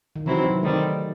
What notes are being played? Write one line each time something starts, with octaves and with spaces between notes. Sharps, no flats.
D#3
C3 E3 F#3 C4 E4
F#3
D#3 G3 A3 C4